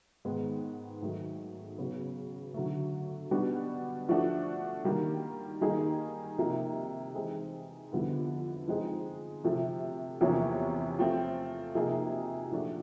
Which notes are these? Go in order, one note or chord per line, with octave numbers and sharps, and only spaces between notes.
G#2 D#3 G#3 B3
G#2 D#3 F#3 A3
C#3 F#3 B3
D3 F#3 A3
B2 G3 B3 D4 F#4
F3 A3 D4 F#4
D#3 G3 A#3
D#3 G3 A#3 D#4 G#4
C3 F3 A#3 D#4
E3 G#3 C4 D#4 G#4
F2 D3 G3 B3 E4
F3 G#3 C4 D#4 G#4
C3 F3 A3
E2 C3 F3 A#3 C#4
F3 A3 C4 F4
C3 F3 A#3 D#4 G#4
A#2 F3 A3 D4 F#4